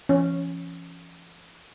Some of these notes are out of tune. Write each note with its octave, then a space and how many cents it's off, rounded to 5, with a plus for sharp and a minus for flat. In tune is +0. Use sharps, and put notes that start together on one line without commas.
F3 -45 C#4 +0